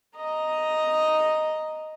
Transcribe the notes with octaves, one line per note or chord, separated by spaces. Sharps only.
D#5 A#5